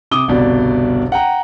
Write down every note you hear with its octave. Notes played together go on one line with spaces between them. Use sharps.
C3 D6 D#6 G7
G1 C2 B2 D5
F#5 G5 A#5